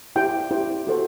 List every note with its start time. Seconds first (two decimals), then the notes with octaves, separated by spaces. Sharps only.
0.16 E4 G4 C5 G5
0.51 E4 G4 C5
0.87 F#4 A4 C5